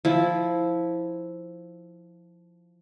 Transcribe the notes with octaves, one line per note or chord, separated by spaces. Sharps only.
F3 E4